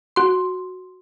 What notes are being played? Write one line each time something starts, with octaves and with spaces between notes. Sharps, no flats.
F#4 C6